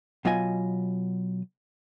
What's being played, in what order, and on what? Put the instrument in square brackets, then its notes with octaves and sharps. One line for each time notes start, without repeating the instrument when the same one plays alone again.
[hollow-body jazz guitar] B2 F#3 F4 D#5 G#5